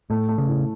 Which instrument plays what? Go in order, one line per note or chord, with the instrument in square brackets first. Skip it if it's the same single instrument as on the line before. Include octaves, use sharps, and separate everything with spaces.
[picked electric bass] A2 [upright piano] A3
[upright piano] A3
[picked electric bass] C#3
[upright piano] A2